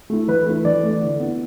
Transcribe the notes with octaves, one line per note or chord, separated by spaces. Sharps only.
A3 E4
E3 B4
A3 E4
E3 D5
A3 E4
D3
B3 E4